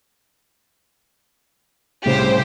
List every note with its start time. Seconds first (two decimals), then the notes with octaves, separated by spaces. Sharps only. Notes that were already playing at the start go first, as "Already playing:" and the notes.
2.06 C2 A2 C#3 G4 C5